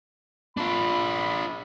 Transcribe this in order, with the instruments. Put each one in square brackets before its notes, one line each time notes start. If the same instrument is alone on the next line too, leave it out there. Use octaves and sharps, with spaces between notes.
[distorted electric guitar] D4 F4 [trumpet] B5